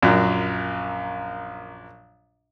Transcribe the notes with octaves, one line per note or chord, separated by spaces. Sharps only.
A#1 F#2 A#2